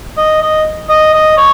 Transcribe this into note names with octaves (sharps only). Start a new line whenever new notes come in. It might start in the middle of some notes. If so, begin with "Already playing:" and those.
D#5
D#5
D#5
D#5
C#5